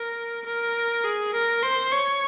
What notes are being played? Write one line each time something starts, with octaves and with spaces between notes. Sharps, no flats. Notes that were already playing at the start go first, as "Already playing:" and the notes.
Already playing: A#4
A#4
G#4
A#4
C5
C#5